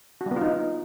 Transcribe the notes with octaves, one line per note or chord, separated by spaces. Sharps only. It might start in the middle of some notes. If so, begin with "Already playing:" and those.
F#4
G3
B3
F4
D#4